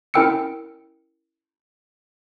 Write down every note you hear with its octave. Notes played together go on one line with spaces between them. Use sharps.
C#4 E4 A#4 G5 E6 C#7